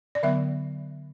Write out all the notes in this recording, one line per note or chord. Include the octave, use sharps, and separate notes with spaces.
D5
D3 F#3 B3 E5